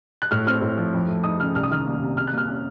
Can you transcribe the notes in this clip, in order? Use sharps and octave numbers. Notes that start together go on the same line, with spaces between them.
F#6
A2 F6
C4 F6
A2
F3
F2
A3
D#4 D#6
C#3 F6
C2 F6
D#6
D#3 F6
A#3
C3
C3 F6
F#6
A#3 F6
C#4